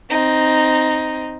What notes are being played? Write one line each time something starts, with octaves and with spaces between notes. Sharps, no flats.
C4 D#4